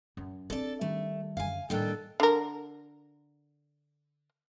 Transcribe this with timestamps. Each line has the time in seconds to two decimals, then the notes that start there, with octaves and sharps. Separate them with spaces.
0.17 F#2
0.50 C4 D4 A4 D5
0.81 D#3 G3 A3
1.37 F#2 D3 F5 G#5
1.70 A2 D#3 G3 A#3 D4 A4 G5 F#6
2.20 D3 A#4